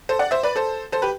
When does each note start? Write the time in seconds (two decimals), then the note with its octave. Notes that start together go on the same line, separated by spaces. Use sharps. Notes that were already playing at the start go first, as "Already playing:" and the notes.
0.09 A4 C5
0.19 D5 F#5
0.31 C5 E5
0.43 B4 D5
0.56 A4 C5
0.92 A4 C5
1.02 G4 B4